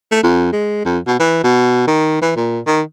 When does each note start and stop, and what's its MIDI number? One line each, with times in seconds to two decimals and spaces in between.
0.11 0.22 57
0.23 0.52 41
0.52 0.80 56
0.85 0.99 41
1.07 1.15 47
1.19 1.41 52
1.44 1.85 47
1.87 2.20 51
2.21 2.32 52
2.36 2.60 46
2.66 2.82 51